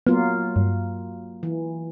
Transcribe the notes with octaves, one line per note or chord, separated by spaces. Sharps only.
F#3 A#3 B3 F4
G2
E3